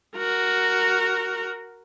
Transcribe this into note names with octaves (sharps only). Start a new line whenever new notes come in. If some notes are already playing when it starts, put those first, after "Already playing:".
F#4 A#4